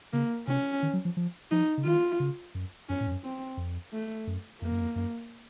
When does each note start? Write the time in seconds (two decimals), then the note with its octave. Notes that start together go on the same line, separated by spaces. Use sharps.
0.13 C#3 A#3
0.47 C3 C#4
0.83 D#3
0.93 F#3
1.05 F3
1.17 F3
1.51 F3 D#4
1.77 C#3
1.85 D#3 F4
2.20 C#3
2.55 F#2
2.89 F#2 C#4
3.00 A2
3.07 F2
3.11 F#2
3.24 C4
3.57 F2
3.93 A3
4.27 F#2
4.62 F2 A#3
4.71 F#2
4.81 F2
4.96 F#2